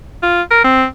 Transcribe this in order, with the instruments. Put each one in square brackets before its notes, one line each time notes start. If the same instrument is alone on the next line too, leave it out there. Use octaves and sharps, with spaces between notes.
[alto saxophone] F4
A#4
C4